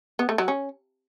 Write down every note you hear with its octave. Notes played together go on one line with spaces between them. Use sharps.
B3
A3
F#3
C#4